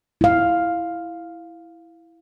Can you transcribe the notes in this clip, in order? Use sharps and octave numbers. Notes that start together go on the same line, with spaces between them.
E4 F5